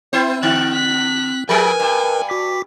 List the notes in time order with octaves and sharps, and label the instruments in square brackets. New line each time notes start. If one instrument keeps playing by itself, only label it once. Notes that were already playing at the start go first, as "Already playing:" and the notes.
[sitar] B3 E4 C5 [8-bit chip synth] C4
[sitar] D3 [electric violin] F#6
[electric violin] F#6 B6
[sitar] F3 G#4 [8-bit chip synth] A#4 B4 [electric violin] G#5
[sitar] G2
[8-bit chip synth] F#4 D6 B6